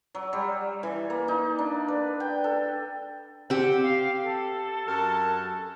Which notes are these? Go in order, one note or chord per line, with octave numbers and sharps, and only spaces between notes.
F#3
G3
E3
A#3
D#4
D4
B4
G5
A4
C4 G4 F#5
F5
A4
F#2 A#4 A5